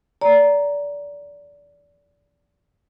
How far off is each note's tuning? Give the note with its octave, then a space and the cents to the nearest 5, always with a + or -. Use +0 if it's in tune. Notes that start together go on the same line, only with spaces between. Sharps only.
D5 -25 A#5 +0